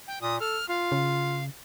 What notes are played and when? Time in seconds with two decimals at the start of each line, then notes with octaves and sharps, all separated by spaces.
0.08 G5
0.22 A#2 D#6
0.40 A4 F6
0.69 F4 F5
0.92 C#3